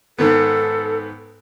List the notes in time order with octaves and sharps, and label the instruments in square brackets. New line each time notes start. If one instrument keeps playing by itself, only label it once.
[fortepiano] G#2 D#3 B3 [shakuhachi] A4